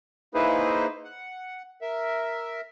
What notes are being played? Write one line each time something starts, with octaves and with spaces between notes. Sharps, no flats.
A#3 D#4 E4 G#4 B4 C5
F#5
A#4 E5